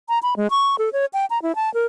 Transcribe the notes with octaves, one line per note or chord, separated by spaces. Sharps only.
A#5
B5
G#3
C#6
A4
C#5
G5
A#5
E4
A5
A#4